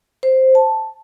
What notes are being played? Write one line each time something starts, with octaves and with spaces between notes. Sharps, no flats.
C5
A5